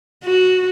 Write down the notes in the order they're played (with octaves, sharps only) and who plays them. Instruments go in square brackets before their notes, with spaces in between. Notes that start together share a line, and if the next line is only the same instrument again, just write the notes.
[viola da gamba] F#4